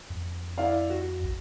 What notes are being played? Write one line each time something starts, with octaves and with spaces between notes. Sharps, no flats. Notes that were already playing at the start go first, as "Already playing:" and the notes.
F2
E4 D5 F5
F#4
A#1